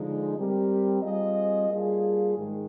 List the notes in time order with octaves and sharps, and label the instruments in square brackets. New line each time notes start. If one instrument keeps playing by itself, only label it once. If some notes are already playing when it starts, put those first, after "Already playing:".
Already playing: [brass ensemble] D3 F3 G#3 D#4
G3 C4 G4 A#4
G3 C4 F4 G#4 D#5
G3 A#3 D4 F4 G#4
G#2 D#3 G#3